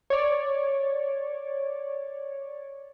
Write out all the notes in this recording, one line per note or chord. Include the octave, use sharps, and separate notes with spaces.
C#5 D5